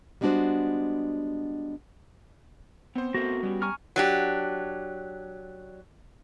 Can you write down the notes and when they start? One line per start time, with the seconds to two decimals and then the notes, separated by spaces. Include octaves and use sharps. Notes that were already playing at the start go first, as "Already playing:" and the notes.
0.21 G3 G#3 B3 D4 F#4 C5
2.95 B3 C4 C5
3.14 B3 F#4 A4 A#4
3.43 G3 B3 C#4 G4
3.62 G#5 A#5 C#6 F6
3.96 F#3 D4 G4